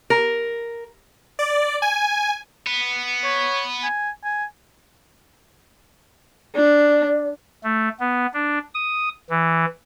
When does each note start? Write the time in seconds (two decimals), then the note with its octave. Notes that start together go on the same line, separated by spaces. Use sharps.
0.10 A#4
1.39 D5
1.82 G#5
2.67 B3
3.24 C#5
3.83 G#5
4.24 G#5
6.55 D4 D5
7.64 A3
8.00 B3
8.34 D4
8.74 D#6
9.30 E3